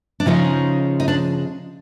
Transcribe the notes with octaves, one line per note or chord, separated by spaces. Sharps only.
D4
C#3 F3 G#3 C#4 D#4
D#4
D4